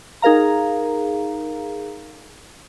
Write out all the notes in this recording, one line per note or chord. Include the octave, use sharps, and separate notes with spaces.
D#4 G#4 A#4 F5 A#5